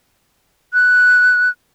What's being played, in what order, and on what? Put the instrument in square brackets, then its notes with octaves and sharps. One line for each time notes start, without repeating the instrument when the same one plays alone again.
[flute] F#6